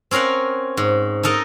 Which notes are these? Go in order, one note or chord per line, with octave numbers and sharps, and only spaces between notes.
C4 C#4 A#4 F5 F#5
G#2
D#4 A4 A#4 D#5